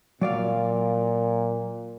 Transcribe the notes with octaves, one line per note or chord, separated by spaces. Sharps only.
A#2 F#3 D5 F5